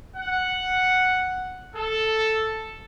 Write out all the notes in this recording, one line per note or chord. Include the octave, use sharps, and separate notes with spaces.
F#5
A4